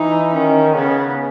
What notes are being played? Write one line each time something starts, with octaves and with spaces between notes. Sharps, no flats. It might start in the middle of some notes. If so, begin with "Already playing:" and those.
Already playing: E3 D#4
D#3 C#4
C#3 B3